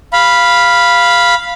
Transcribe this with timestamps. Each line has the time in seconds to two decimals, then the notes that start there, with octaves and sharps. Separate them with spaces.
0.13 F5 B5